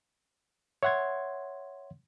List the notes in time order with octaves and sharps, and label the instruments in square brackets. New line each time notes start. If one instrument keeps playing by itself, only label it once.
[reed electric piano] C#5 E5 F#5 C6 G#6